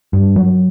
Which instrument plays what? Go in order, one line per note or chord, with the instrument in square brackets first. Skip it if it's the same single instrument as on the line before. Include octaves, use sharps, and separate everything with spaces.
[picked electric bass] G2
F#3